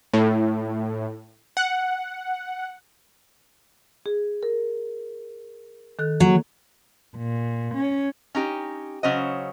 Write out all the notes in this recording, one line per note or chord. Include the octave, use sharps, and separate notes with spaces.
A2
F#5
G#4
A#4
D#3 A4 F#6
F#3 A#3
A#2
C#4
C#4 D#4 G4
C#3 F#3 C#4 C5 D#5